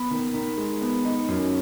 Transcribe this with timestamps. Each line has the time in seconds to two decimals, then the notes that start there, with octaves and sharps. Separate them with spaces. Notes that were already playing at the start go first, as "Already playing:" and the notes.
Already playing: B3 B5
0.11 D#3
0.34 D#3
0.57 G#3
0.82 B3
1.05 D#4
1.28 F#2